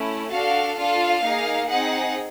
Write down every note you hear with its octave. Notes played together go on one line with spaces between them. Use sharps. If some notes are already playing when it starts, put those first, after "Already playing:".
Already playing: A3 C#4 E4
D4 F#4 A4 F5
D4 F4 A4 F5
A#3 D#4 G#4
C4 D#4 G#4 F#5